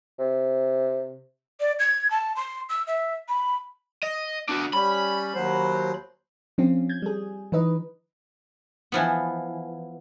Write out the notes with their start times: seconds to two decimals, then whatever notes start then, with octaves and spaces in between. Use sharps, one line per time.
0.19 C3
1.60 D5
1.79 G#6
2.10 A5
2.36 C6
2.69 E6
2.87 E5
3.28 B5
4.03 D#5
4.49 B3 D4 F#4
4.73 G3 C#4 B5
5.34 D#2 F#3 C5
6.58 F3 C4 C#4 F4
6.89 G6 G#6
7.02 G3 G#4
7.52 E3 D#4 B4 D#5
8.92 E3 F3 B3